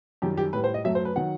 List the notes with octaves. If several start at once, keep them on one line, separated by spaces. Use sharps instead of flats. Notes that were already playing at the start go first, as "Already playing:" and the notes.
F#2 D#3 G3 G4
G4
A2 G3 B4
C5
D#5
F#2 F#3 A3 E5
C5
B4
D#3 F#3 F#5